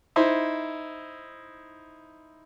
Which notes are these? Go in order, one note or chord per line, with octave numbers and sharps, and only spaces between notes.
D#4 E4 C5